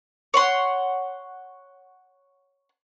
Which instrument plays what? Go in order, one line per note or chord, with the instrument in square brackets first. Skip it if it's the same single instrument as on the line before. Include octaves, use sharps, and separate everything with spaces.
[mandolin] C#5 F#5 C6